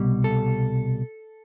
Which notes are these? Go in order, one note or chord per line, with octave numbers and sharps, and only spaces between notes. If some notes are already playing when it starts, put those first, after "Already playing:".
Already playing: C2 B2 G3
A4